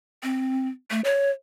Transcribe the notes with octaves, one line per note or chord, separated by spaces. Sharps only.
C4
A3
C#5